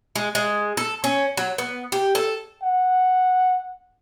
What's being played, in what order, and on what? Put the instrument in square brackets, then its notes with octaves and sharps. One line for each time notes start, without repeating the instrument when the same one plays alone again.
[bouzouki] G#3
G#3
A4
C#4
F#3
B3
G4
A4
[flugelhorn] F#5